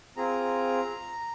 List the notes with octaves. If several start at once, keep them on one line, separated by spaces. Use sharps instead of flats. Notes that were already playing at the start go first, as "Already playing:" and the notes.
C4 F4 G#4 A#5